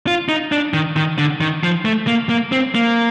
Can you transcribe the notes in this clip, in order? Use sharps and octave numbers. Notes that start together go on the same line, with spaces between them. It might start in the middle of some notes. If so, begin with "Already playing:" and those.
F4
D#4
D4
D#3
D#3
D3
D#3
F3
A3
A#3
A#3
C4
A#3